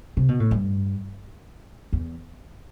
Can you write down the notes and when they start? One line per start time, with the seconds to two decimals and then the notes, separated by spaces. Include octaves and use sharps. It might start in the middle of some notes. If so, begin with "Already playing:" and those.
0.17 C3
0.28 B2
0.40 A2
0.51 G2
1.93 E2